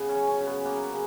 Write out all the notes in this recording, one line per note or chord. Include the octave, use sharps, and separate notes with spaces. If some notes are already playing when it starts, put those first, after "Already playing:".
Already playing: C#3 B3
C#4
F#3
C#4
C#3
B3
A#3 B3
C#3